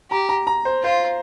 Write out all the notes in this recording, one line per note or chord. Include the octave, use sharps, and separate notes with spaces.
G4 A#5
A#5
A#5
C5
F4 C5